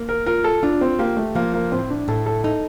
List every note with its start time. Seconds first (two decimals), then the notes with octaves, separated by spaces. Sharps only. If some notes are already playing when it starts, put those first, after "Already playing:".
Already playing: A#3
0.09 A#4
0.26 F4 A#4
0.44 A4
0.63 D4 F4
0.81 C4
0.99 A#3 G4
1.17 A3
1.35 F3 A#3
1.54 A#3
1.72 A2 C4
1.90 D4
2.08 A2 A4
2.26 A4
2.44 D#4 A4